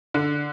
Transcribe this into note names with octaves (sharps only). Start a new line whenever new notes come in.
D3